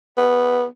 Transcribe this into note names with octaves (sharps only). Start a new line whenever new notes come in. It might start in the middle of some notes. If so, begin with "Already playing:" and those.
B3